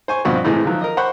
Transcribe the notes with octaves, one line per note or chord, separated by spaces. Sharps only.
C5 G#5 C#6
G2 B2 F3 C4 F#4
A2 C3 E3 G#3 A3
D#3 F3 F#3
A#4 D#5
C5 F#5 B5 C#6